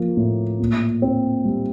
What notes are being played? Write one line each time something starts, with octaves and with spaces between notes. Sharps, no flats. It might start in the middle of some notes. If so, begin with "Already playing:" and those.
Already playing: F3 A#3
A2
A#2
C4
G3